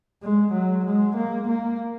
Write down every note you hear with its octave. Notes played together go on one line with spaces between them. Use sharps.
G#3
F#3
G#3
A#3
A#3